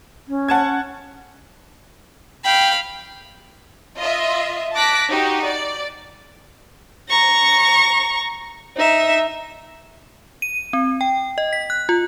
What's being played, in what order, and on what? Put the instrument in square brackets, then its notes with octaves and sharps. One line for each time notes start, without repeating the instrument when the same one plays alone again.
[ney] C#4
[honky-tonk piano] F#5 A5 G#6
[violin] F5 B5 [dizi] G5
[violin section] F4 D#5 E5
A5 D6 F#6 A#6 B6 D7
D#4 F#4 G4
D5
[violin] A#5 C#6
D#4 E5
[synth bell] D#7
C4
G5
D#5
B6
F#6
F4